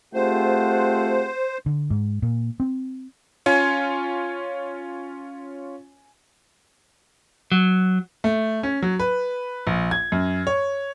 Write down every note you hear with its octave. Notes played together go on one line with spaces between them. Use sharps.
A3 C4 F4 G4 G#4 C5 F#5
D3
G#2
A#2
C4
C#4 F4 C#5 G#5
F#3
A3
C#4
F#3
B4
A#1
G#6
F#2
C#5